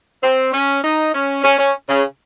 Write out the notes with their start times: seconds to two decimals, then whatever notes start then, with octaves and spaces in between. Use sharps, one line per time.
0.23 C4
0.53 C#4
0.83 D#4
1.14 C#4
1.43 C#4
1.59 C#4
1.89 C#3